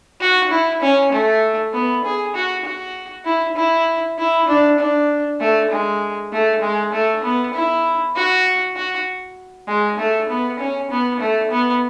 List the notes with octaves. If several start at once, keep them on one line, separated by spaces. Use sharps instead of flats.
F#4
E4
C#4
A3
B3
G#4
F#4
F#4
E4
E4
E4
D4
D4
A3
G#3
A3
G#3
A3
B3
E4
F#4
F#4
G#3
A3
B3
C#4
B3
A3
B3